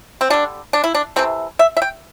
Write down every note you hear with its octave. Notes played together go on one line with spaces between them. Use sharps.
C4
D3 G3 D4
D4
E4
D4
C3 E3 A3 C4
E5
E5
G5